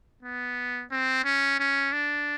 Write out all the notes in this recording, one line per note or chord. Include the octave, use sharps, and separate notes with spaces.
B3
C4
C#4
C#4
D4